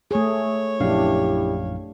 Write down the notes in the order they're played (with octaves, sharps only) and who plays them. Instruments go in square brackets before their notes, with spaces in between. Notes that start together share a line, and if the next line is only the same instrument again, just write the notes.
[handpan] A3 G#4 [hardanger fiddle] C#5
[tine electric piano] A#1 F#2 F5 [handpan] D4 [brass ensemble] E4 G4